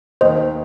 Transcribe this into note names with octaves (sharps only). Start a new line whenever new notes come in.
D#2 D#3 A#3 C5 D#5